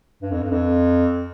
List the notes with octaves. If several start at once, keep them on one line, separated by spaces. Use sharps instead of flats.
G2
F2
G2
F2